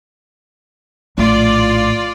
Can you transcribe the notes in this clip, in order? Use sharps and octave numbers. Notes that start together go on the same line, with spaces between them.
A#1 A2 F4 D5